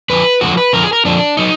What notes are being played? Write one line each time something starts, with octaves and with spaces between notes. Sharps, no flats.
F2 D3 F3 B4
F2 D3 F3 F#4
B4
F2 D3 F3 A#4
G#4
A#4
F2 D3 F3 D4
F#3 D#4